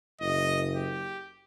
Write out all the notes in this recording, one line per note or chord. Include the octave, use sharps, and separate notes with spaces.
F#1 D#5
G4